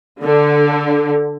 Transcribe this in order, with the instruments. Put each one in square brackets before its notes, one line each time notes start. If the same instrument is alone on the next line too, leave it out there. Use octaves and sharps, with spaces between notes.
[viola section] D3